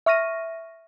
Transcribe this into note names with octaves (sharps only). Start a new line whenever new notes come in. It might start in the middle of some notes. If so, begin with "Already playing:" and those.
E5 C#6 F6 A#6 D#7